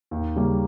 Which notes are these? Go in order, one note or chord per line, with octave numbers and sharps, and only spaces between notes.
D#2
C#3 G3 A#3